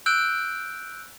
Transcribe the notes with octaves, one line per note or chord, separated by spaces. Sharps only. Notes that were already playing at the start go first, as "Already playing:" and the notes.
E6 F#6 G6 D7